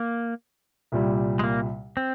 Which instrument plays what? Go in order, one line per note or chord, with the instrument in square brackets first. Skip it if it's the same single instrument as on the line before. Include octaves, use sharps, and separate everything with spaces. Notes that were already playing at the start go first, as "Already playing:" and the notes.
Already playing: [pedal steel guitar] A#3
[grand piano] C2 A#2 G3
[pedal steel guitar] G#3
A#3
C4